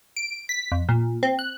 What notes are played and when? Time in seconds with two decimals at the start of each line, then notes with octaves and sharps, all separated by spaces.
0.17 D7
0.49 B6
0.72 F2
0.89 A#2
1.23 C4
1.39 F#6